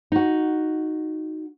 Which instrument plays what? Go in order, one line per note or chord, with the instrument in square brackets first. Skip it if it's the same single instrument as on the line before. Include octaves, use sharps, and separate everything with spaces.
[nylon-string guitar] D#4 F#4